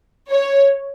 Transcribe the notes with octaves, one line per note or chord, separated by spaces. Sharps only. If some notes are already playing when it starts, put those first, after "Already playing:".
C#5